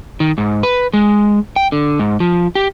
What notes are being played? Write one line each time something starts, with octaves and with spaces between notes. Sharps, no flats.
D#3
G#2
B4
G#3
G5
D3
G#2
F3
G4